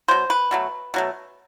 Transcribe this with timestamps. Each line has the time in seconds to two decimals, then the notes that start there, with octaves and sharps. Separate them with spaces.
0.08 B2 F#3 C5
0.30 B4
0.51 B2 F#3 A3
0.94 B2 F#3 A3